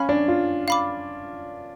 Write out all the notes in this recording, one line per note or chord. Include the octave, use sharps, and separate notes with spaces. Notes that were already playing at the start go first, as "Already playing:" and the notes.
Already playing: C#4 F5 G#5 B5 F6
D4
F4
F5 B5 D6